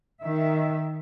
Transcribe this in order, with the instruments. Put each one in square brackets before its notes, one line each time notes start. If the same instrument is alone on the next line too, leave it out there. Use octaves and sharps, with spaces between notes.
[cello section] D#3 E5